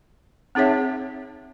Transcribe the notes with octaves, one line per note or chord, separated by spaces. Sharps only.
C4 D#4 G#4 C#5 E5